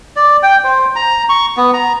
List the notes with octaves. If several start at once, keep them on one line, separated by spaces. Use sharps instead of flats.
D5
G5
C5
A#5
C#6
B3
A#5